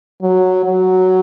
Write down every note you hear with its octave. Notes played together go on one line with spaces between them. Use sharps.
F#3
F#3